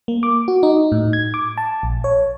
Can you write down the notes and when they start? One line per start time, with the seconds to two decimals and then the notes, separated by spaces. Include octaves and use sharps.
0.08 A#3
0.23 D6
0.48 F#4
0.63 D#4
0.92 A2
1.13 G#6
1.34 D6
1.58 A5
1.83 A#1
2.04 C#5